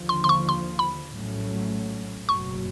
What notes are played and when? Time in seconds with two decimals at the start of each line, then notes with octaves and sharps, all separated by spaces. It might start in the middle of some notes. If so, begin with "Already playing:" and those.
Already playing: D#2 D3 F3
0.09 C6
0.24 C6
0.29 C#6
0.49 C6
0.79 B5
1.09 A#1 A2 F#3 A3 C#4
2.28 F#1 E2 B2 F#3 C#6